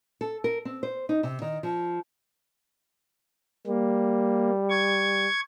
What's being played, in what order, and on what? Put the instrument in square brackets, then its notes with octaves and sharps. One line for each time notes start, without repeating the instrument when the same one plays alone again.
[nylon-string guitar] A4
A#4
C4
C5
D#4
C3
D#3
F3
[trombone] G3 [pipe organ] A#3
[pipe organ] C#6 G#6